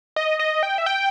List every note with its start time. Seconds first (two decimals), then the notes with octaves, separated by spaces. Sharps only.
0.16 D#5
0.39 D#5
0.63 G5
0.78 E5
0.86 G5